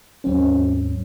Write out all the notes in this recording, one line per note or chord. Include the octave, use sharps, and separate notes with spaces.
D#2 G#2 F#3 C4 C#4